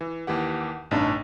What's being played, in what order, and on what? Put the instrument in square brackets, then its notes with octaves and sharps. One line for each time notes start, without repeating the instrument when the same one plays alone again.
[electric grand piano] E3
D#2 E3 G4 F#5
A1 G2 C3 D4 D#4 A5